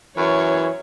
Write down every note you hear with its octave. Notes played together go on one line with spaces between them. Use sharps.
F#2 E3 C#5